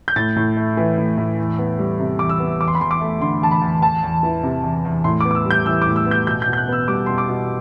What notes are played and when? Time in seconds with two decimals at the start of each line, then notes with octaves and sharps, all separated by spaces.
0.08 G6
0.16 A2 A6
0.36 A2
0.57 A3
0.77 E3
0.98 A2
1.17 A2
1.38 E2
1.59 B3
1.79 G3
2.00 C3
2.19 E2 D6
2.29 E6
2.39 B3
2.60 E2 D6
2.68 C6
2.75 B5
2.80 E2 C6
2.91 D6
3.01 A3
3.21 D3 C6
3.42 E2 A5
3.51 B5
3.62 E2
3.82 E2 A5
4.03 E2
4.23 E3
4.43 C3
4.64 E2
4.85 E2
5.04 A2 C6
5.21 D6
5.25 B3
5.31 D6
5.35 E6
5.45 G3
5.51 G6
5.66 E3 E6
5.82 D6
5.86 A2
5.96 E6
6.06 B3
6.11 G6
6.27 B2 G6
6.42 G6
6.48 B2
6.53 G6
6.57 F#6
6.68 B3 E6
6.88 G3 D6
7.06 B2 C6
7.18 D6
7.29 B2